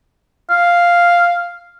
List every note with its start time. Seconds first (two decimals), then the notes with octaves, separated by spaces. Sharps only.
0.50 F5